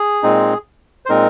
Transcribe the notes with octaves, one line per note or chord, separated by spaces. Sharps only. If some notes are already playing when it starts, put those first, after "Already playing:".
Already playing: G#4
A#2 G#3 C4 D#4
C5
A#2 G#3 C4 D#4 A#4